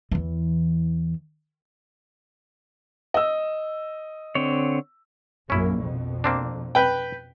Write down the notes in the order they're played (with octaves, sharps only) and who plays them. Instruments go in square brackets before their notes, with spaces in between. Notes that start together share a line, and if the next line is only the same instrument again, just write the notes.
[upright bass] E2 E3
[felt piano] D#5 E6
[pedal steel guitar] D3 C4 C#5
[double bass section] A#1 F#2 A#3 [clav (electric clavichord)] C#4 E4
[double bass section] F2 B2
[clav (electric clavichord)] A#3 C4 D4
[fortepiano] B4 G5